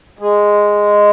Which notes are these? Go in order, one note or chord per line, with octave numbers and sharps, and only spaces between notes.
G#3